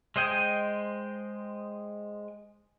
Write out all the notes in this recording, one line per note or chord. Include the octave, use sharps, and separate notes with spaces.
G#3 C5 D#5 G5 G#5